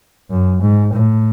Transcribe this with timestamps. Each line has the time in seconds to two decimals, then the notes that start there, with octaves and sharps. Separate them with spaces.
0.30 F#2
0.62 G#2
0.93 A2